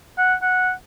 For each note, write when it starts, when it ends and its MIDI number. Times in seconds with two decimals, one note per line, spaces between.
0.18 0.34 78
0.42 0.71 78